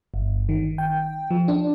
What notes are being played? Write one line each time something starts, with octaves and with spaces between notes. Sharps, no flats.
G1
D#3
G5
F3
D4